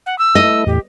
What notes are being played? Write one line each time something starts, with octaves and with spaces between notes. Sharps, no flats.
F#5
E6
A3 E4 D#5
E2 A2 G4